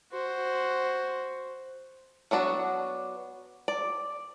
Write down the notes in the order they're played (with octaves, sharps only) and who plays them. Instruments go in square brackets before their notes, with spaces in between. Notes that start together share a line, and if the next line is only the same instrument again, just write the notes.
[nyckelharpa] F#4 C5
[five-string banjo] F#3 B3 D4 F#4
D5